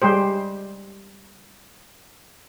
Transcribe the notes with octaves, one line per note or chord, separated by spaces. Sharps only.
G3 G#3 G4 C5